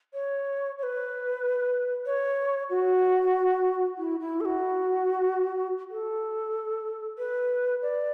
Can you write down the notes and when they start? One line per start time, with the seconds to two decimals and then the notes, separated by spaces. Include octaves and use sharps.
0.14 C#5
0.78 C#5
0.83 B4
2.06 C#5
2.70 F#4
3.98 E4
4.20 E4
4.40 A4
4.45 F#4
5.90 A4
7.18 B4
7.82 D5